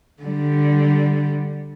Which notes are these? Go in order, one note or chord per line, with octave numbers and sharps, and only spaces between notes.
D3 G3